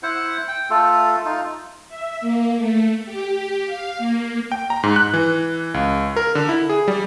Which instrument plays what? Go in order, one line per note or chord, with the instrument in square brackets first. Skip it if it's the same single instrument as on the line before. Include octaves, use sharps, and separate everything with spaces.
[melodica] E4 C5 F#5
G5
A3 F4 A4
D#4 F4
[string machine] E5
A#3
A3
G4
F5
A#3
[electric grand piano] G5
A#5
G#2
F#6
E3
C#2
A#4
D3
E4
G#4
G3